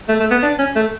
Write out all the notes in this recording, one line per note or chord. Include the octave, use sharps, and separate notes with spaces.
A3
A3
B3
D4
C#4
A3